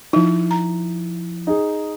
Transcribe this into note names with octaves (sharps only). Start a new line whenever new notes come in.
F3 D#4 E4
A#5
D#4 G#4